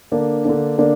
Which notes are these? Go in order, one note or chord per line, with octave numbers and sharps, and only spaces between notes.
D3 A#3 D4
D3 A#3 D4
D3 A#3 D4